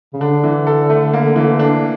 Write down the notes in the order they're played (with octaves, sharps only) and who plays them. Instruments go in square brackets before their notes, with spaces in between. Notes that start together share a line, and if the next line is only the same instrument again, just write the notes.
[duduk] C#3
[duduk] D3 [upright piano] D4
[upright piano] E3
A4
A3
A#3
E3
D4